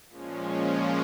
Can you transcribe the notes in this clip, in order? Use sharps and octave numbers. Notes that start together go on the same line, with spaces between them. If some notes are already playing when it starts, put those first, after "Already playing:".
A#2 F3 G#3 C#4